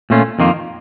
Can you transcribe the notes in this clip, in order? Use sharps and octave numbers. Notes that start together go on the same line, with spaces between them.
A#2 A3 C#4 F4
F2 D#3 A#3 F4